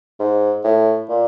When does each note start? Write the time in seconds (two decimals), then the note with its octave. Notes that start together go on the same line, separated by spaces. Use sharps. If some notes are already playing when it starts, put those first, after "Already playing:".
0.20 G#2
0.64 A2
1.09 A#2